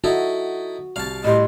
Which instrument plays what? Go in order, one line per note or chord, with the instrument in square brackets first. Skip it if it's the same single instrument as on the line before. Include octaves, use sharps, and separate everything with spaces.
[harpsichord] D#4 E4 A4 [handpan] F#4
[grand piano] C2 [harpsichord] F5 A5
[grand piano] A2 G3 C6 [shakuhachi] D#5